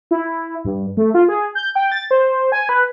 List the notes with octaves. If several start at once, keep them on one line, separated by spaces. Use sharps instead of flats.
E4
G2
A3
F4
G#4
G6
G5
A6
C5
G#5
B4